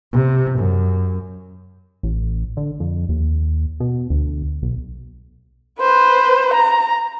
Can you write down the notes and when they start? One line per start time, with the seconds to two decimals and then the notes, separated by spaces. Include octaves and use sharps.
0.13 C3
0.59 F#2
2.03 A1
2.57 D3
2.80 F2
3.09 D#2
3.80 B2
4.10 D2
4.62 B1
5.80 B4 C5
6.53 A#5